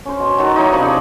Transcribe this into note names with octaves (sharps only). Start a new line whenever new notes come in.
C#4 C5
B2
D#3 F#3 F#4 A5
D#4 E4 C#5 D5
C3 F3 D4 B5
G#4